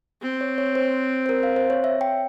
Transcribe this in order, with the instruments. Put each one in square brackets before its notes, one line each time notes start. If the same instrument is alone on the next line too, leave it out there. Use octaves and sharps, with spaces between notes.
[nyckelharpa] C4
[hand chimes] C#5
C#5
C5
C5
A#4
F5
C5
C#5
E5
G5